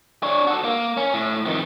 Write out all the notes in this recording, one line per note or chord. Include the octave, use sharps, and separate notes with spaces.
D4 C#5
F#4 A4
A#3
C#4
A2
F2 D#3